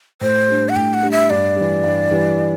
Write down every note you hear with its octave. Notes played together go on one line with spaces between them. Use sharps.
A2 C5
G3 D4
F#5
A2 G5
F#5
G3 D4
E5
G2 D5
E3 G3
G2
E3 G3